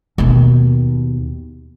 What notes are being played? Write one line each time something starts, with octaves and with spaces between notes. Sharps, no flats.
D#2 B2